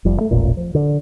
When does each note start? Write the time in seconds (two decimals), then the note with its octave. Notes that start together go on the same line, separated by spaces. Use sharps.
0.05 F1 F3 G3
0.17 G2 A3
0.31 E1 A1 A#2
0.57 F3
0.75 D3